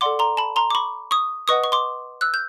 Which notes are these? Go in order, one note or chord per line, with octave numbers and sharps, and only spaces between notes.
A4 D5 F#5 C6 D6
A#5 C6
A5 B5
A#5 C6
D6
B5 C#6
C#6 D#6
B4 D#5 F#5 C#6 D#6
C#6
C6 D6
E6 F#6
G6